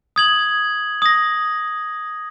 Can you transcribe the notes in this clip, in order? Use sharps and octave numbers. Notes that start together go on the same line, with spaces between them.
D#6 G#6 F#7
D#6 A#6